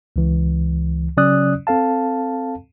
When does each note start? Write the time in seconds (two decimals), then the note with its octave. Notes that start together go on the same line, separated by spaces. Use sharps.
0.16 C#2 E3
1.17 C#3 F#3 C#4 D5 D#6 F#6
1.67 C4 A4 F5 A5